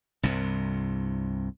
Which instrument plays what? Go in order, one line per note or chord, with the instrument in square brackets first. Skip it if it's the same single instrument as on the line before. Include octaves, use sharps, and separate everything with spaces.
[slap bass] C2 G2 C3